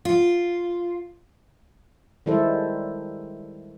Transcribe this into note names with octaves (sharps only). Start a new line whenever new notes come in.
F4
D#3 G3 G#3 E4 A4 C5